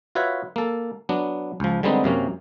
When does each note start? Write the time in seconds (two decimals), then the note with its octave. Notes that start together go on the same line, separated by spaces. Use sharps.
0.15 F4 F#4 B4 C#5 E5
0.56 A#3 A4
1.09 F#3 B3 D4
1.60 C#2 F3
1.83 D3 G3 G#3 B3 C4 D#4
2.04 F#2 C3 A#3 C#4